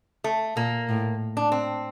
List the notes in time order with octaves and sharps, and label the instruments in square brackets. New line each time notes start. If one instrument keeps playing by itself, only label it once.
[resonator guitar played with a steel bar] A3
[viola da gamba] A#2 [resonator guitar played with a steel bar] A#3
[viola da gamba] A2
[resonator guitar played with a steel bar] D4
C4